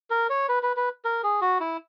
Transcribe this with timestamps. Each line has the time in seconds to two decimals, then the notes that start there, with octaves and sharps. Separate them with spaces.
0.10 A#4
0.30 C#5
0.49 B4
0.63 B4
0.77 B4
1.05 A#4
1.23 G#4
1.41 F#4
1.60 E4